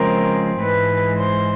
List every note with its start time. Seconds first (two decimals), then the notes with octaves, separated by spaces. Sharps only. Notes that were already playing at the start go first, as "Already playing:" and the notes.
Already playing: C#3 F3 G#3 C4 A#4
0.61 G#2 E3 G#3 B4
1.17 C5